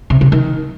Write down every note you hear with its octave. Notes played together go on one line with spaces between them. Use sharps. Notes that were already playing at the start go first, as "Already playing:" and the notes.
C3
C3
D#3